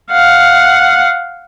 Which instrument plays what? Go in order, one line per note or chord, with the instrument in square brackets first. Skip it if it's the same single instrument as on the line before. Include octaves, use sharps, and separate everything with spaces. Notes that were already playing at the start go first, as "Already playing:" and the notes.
[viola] F5 F#5